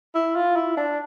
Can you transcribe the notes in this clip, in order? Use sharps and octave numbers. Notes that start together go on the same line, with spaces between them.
E4
F4
E4
D4